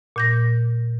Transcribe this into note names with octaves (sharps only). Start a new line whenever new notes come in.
A#2 G6 A#6